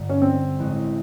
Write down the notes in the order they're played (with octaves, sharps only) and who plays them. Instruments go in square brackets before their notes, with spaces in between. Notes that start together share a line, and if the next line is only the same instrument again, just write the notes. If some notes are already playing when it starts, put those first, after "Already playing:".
Already playing: [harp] G1 G2 D3
[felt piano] C#4
C4
[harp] A1 A2 E3 G#3 C#4